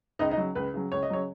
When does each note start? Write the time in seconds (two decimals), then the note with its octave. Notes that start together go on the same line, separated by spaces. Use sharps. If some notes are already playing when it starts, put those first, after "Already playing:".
0.19 C#2 D#4 D#5
0.31 D#4 D#5
0.37 C#3 F#3
0.55 C#2 B4
0.74 C#3 F#3
0.92 C#2 C#5
1.03 D#5
1.10 C#3 F#3 C#5